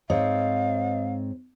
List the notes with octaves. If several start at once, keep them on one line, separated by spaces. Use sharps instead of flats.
G#2 C4 C#5 D#5 F5